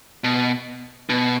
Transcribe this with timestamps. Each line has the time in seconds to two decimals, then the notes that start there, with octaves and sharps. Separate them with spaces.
0.24 B2
1.09 B2